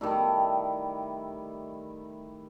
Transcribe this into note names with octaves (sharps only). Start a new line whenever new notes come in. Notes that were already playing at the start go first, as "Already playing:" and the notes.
D#3 G3 A3 E4